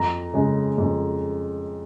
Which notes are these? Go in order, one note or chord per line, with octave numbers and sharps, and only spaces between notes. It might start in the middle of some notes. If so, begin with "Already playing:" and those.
Already playing: F2 A#5
C#3 G#3
F2